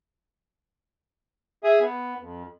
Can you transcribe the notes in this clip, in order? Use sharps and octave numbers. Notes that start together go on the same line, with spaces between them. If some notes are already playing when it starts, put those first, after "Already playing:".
G#4 E5 G#5 D#6
B3
F2